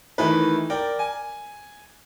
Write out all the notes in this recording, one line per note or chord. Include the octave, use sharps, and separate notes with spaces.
D#3 E3 A3 D#4 B4
A#4 D5 G5
G#5